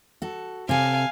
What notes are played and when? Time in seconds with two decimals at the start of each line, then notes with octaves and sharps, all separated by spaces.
0.22 F#4 A4
0.69 C3 A4 F5 G#5